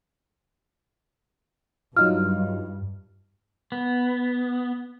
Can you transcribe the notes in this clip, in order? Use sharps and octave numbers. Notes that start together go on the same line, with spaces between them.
G2 F#3 D#4 F4 F6
B3